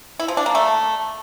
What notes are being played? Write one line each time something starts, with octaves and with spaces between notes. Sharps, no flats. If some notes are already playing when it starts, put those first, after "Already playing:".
E4
F3
D4
A#3
A3